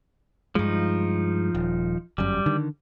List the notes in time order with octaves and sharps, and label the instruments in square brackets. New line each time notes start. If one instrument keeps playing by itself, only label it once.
[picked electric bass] G2 G#3 [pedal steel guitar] F3 D#4
[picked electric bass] D#1
[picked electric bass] G1 F#2 [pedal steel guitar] G3
[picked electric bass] D3 D#3